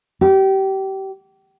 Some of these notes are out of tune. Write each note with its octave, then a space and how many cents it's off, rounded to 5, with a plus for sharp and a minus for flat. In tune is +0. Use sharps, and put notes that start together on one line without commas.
G4 -25